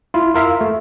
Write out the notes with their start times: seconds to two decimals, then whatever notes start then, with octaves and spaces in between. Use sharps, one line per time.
0.14 E4 F4
0.34 F4 A#4 E5 F5
0.61 A3